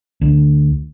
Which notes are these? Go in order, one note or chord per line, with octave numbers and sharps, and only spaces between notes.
D2